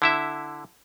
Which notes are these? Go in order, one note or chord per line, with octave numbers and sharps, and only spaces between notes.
D3 E4 E5